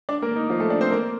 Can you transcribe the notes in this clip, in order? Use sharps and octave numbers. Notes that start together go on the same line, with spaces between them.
D4 D5
A#3 A#4
D#4
F3 F4
A3 A4
D4 D5
C4 C5
A#3 A#4